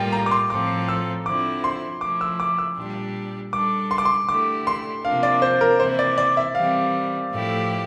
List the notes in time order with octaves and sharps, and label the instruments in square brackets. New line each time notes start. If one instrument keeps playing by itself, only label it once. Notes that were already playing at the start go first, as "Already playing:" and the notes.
Already playing: [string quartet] A2 G3 A#3 F4 [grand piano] G5
[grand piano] A#5
D6
C6
[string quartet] A2 F3 C4 F4 A4 [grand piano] D6
[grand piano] E6
[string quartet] D3 F3 C4 E4 [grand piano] D6
[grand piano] C6
[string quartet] F3 A3 E4 [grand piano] D6
[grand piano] E6
D6
E6
[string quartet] A#2 G3 D4 G4
[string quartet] G3 D4 A4 [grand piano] D6
[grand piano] C6
D6
C6
[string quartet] D3 A3 E4 G4 [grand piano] D6
[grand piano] C6
[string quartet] C3 F3 A#3 D4 [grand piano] F5
[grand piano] D5
C5
A#4
[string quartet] C3 E3 A#3 E4 [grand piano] C5
[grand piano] D5
D5
E5
[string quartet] E3 G3 C4 [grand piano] F5
[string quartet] A2 F3 A3 E4 G4